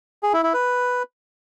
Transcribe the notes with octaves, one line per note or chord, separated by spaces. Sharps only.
G#4
E4
E4
B4